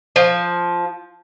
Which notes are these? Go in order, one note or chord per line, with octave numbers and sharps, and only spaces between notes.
F3